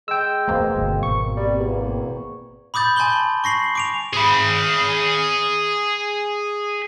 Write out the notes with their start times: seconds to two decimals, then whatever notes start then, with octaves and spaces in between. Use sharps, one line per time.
0.08 G#3 G5 E6
0.48 E2 B2 A3 A#3 C4
0.75 G1 G2 D3
1.03 G#1 C#6
1.37 G3
1.59 E2
2.74 B5 D6 D#6 G6 A6
2.96 G#5 A5 C6 G6 F#7 G7
3.44 C#6 A#6 C7 F#7
3.75 D6 D7 F7
4.13 G#4 B5